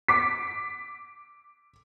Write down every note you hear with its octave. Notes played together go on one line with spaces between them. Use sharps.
D6 B6